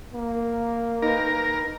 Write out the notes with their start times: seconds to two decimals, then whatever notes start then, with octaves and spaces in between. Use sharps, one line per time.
0.14 A#3
1.02 D#4 A#4 B4